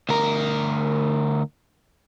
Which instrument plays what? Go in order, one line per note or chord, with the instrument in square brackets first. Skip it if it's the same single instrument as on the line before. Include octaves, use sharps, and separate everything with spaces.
[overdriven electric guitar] D2 A#4